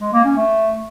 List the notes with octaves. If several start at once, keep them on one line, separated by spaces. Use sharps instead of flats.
G#3
A#3
C#4
A3